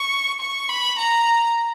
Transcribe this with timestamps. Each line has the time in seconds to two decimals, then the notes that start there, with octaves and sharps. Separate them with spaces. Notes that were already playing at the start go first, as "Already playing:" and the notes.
Already playing: C#6
0.41 C#6
0.69 B5
0.98 A#5